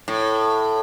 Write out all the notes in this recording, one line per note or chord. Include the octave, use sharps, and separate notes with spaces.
A2